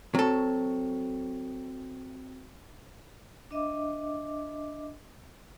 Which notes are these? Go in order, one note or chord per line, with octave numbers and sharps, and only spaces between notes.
F#3 C4 A4
D4 D#5 E5 D6